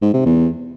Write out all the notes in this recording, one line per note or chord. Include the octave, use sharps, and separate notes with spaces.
G#2
C3
E2